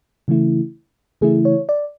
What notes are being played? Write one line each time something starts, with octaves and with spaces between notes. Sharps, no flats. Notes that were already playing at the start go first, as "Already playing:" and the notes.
C#3 E3 A3 E4
C#3 E3 A3 E4 G#4
C#5
D5